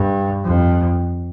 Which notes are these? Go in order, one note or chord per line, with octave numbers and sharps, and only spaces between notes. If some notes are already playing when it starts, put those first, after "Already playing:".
Already playing: G2
F2